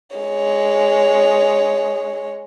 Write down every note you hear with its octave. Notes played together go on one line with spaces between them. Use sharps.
G#3 C#5